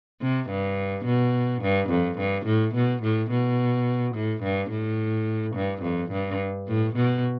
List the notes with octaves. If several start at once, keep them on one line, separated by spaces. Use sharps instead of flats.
C3
G2
B2
G2
F2
G2
A2
B2
A2
B2
A2
G2
A2
G2
F2
G2
A2
B2